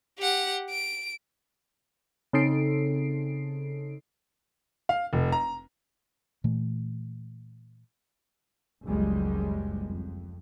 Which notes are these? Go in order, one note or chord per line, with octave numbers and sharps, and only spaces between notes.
G4 F#5
D7
C#3 C4 D#4 A4 C7 D7
F5
F1
A#5
A#2 E3 A3
F#1 C#2 F#2 C#3 G3 G#3
F2